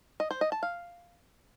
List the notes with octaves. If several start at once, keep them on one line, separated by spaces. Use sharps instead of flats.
D#5
C5
D#5
A5
F5